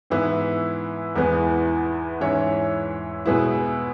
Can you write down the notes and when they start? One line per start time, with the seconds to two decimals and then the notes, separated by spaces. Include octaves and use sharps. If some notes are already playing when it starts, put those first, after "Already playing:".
0.10 G#2 E3 B3 E4
1.16 E2 E3 G#3 B3
2.21 G#2 E3 C#4 E4 C#5
3.25 B2 G#3 B3 E4